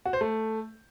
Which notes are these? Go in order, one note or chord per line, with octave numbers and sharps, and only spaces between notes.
F#4
C5
A3